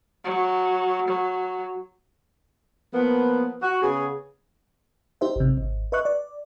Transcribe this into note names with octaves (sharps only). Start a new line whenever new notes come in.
F#3
F#3
F3 A#3 B3
F#4
C#3 B3 G#4
D#4 G4 C5 E5
G#1 C3
G#1
B4 D#5 E5 C#6 F#6
D5